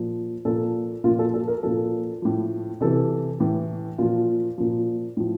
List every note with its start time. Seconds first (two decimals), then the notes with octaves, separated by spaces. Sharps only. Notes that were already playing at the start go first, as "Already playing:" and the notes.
Already playing: A#2 F3
0.45 A#2 F3 A4
1.04 A#2 F4
1.08 F3
1.19 A4
1.34 A4
1.48 A#4
1.63 A#2 F3 A4
2.22 A2 F3
2.81 C3 E3 A4
3.40 A2 E3
3.98 A#2 F3 F4
4.58 A#2 F3
5.17 A2 F3